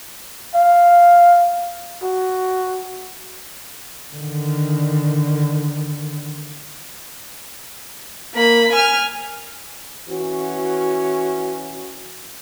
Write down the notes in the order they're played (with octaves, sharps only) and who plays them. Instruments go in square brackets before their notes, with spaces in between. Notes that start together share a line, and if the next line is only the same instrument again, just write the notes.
[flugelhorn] F5
F#4
[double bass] D3 D#3
[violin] A#3 B5
G#5 F6
[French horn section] E3 C#4 F#4